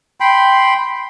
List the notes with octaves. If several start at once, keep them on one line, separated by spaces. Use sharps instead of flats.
G5 B5 C6